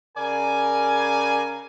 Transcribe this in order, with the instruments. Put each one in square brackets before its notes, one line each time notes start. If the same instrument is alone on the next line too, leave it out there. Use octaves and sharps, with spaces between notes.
[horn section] C#3 A#4 D5 G#5